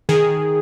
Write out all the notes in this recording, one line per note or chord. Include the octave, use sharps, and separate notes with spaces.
D#3 G#4